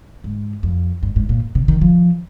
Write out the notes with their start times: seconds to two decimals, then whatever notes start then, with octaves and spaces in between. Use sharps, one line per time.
0.24 G#2
0.63 F2
1.03 G2
1.16 G#2
1.29 A#2
1.55 C3
1.68 D#3
1.81 F3